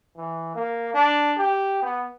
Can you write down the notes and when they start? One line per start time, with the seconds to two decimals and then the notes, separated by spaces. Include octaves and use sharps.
0.17 E3
0.55 A#3
0.94 D4
1.37 G4
1.83 B3